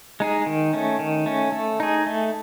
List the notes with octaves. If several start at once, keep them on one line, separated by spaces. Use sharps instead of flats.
G#3 D#4 G#4
D#3
A3 C#4
D#3
A3 C#4
A3
D#4 G#4
A3